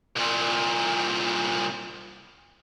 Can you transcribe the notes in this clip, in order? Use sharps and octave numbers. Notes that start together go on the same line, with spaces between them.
C2 A#2